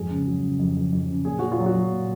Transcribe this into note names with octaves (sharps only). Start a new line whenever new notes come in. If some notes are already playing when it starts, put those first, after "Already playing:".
Already playing: F2 G#2 G#4
C#3
F#3
C#3
F2
F2
F2
C#3
A#2 G#4
A#2 F#4
F4
F#3
F#4
F#3
A#2